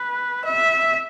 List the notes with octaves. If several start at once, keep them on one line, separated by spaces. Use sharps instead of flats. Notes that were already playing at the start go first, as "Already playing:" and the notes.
Already playing: B4
E5